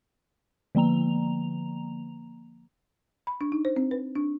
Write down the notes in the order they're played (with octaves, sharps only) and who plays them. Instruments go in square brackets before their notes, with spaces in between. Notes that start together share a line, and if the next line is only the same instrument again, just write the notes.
[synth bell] D3 F3 A#3 A#5 F7
[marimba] B5
D4
D#4
C5
C4
B4
D4